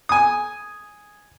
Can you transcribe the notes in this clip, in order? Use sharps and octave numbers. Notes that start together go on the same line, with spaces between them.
G#5 D#6